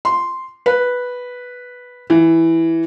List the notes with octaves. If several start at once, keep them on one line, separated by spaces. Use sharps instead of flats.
C6
B4
E3